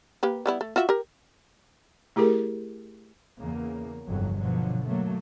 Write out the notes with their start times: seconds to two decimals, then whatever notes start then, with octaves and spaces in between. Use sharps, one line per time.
0.23 A#3 G4 B4
0.46 G3 B3 E4
0.61 A3
0.76 F4 F#4 E5
0.89 G4 A#4
2.16 A3 E4 G4 G#4 A#4
3.39 E2 C#3 A#3
4.08 G1 C2 F2 D3 F#3
4.39 B2 D3 F3 F#3
4.84 F#3 A3 A#3